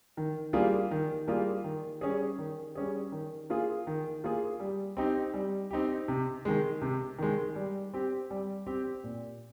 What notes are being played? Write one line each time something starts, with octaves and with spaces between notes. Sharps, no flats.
D#3
G3 A#3 F4 G#4
D#3
G3 A#3 F4 G#4
D#3
G3 C#4 G#4
D#3
G3 C#4 G#4
D#3
A#3 F4 G#4
D#3
A#3 F4 G#4
G3
C4 D#4 G4
G3
C4 D#4 G4
C3
D#3 G#3
C3
D#3 G#3
G3
C4 G4
G3
C4 G4
A#2